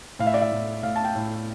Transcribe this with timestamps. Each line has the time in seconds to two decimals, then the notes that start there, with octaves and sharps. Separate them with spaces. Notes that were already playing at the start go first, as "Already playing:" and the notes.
0.19 A2 F5
0.27 E5
0.34 D5
0.42 E5
0.52 A2
0.83 A2 F5
0.96 A5
1.04 G5
1.16 A2